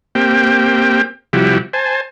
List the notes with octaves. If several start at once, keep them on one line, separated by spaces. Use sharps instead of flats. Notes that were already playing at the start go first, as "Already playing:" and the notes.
A#3 C4 G4 G5
C3 F3 G3 E4 F#4 G4
C5 G#5 A5